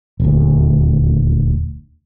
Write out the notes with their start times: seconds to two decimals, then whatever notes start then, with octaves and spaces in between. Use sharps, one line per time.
0.20 D#1 D2